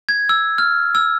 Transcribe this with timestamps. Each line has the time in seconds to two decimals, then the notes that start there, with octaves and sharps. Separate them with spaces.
0.09 G#6
0.29 E6
0.58 F6
0.95 E6